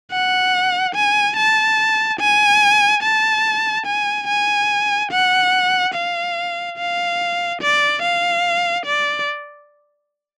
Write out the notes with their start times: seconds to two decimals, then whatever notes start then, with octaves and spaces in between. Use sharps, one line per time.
0.12 F#5
0.95 G#5
1.37 A5
2.20 G#5
3.03 A5
3.86 G#5
4.28 G#5
5.12 F#5
5.95 F5
6.78 F5
7.62 D5
8.03 F5
8.86 D5